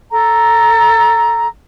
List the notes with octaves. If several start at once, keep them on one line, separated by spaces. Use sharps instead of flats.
A4 A#5